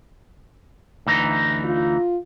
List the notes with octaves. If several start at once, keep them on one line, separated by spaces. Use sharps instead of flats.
D2 E3 D#4
F4